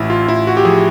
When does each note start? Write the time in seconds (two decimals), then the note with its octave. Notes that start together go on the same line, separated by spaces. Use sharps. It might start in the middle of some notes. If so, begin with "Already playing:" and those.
Already playing: A1 E4
0.10 F4
0.28 A1 E4
0.47 F#4
0.57 G4
0.65 F3 G#4